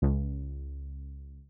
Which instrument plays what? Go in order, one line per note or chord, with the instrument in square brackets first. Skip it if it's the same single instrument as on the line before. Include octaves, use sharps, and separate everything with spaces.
[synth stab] C#2